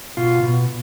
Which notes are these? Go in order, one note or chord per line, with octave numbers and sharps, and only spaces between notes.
B2 F4
B2